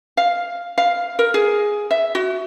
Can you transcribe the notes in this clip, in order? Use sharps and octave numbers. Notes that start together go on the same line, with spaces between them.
F5
F5
A#4
G#4
E5
F#4